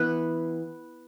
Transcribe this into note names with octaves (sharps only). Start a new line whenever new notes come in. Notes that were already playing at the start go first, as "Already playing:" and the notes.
Already playing: E3 B3 B4